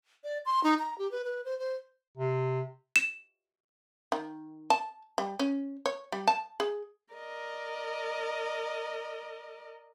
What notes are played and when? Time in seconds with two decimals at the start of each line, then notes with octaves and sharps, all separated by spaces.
0.24 D5
0.46 C6
0.64 D#4
0.79 A#5
0.98 G4
1.11 B4
1.24 B4
1.45 C5
1.59 C5
2.18 C3
2.96 E7
4.12 D#3
4.70 A5
5.18 G3
5.39 C#4
5.86 C#5
6.12 G3
6.27 A5
6.60 G#4
7.14 A#4 D5 D#5